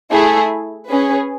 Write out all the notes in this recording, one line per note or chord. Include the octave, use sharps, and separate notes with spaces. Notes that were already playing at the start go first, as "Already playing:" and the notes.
A3 E4 G#4
C#4 G#4 B4